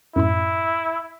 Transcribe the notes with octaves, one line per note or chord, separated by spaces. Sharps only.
F#2 A2 E4 B5